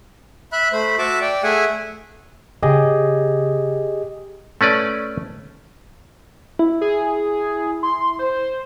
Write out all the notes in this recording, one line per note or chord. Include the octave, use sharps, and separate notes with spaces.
E5 B5 F#6
A3 C5 B5
F#4 E5 A5 D6
D5 G5
A3 G#4 E5 F#5 G#5
C#3 G4 G#4 D#5
A3 C#4 B4 D5
E4
G#4
C6
C5